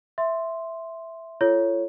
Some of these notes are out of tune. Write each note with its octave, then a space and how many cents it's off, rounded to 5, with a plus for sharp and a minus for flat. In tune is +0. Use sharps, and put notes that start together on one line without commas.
E5 +0 C6 +0
F4 -35 A4 +0 C#5 +0